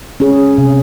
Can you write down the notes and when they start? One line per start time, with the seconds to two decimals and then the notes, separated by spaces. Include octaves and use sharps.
0.20 C#4 G#4
0.58 C3